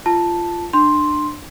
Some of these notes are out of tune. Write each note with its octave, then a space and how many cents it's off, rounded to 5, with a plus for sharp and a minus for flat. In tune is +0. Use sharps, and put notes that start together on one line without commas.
F4 -15 A5 +0
D4 +30 C6 +5